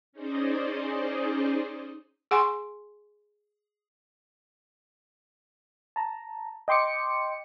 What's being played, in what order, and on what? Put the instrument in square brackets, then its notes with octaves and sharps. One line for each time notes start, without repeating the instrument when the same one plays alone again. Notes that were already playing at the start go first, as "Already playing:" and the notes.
[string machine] C#4 D#4 G#4 C5 D5 D#5
[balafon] G#4 F#5 G#5 C6 C#6
[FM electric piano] A5 A#5
D#5 G5 C6 D6 C#7